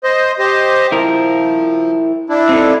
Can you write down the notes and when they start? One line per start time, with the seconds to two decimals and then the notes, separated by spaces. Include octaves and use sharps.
0.04 C5 D#5
0.39 G4 C5 D#5
0.92 F3 E4 A#4
2.30 D4 E4
2.49 C4 D#4 A4